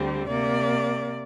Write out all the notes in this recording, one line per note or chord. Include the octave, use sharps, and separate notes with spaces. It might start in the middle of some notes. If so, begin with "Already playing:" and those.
Already playing: D2 D3 G3 C4
C3 A#3 D5